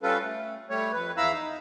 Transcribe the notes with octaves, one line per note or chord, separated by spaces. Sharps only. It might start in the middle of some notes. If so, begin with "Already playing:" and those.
G3 C#4 F4 A4 B4
A3
G3 A3 C#5
F2 B4
E2 E4 F5 A#5 B5 E6
D#4